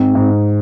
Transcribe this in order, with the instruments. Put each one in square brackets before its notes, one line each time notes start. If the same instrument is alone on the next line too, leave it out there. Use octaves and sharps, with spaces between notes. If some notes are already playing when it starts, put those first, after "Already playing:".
Already playing: [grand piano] G#2 [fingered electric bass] C4
[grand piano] G#2